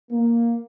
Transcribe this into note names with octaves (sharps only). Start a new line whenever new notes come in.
A#3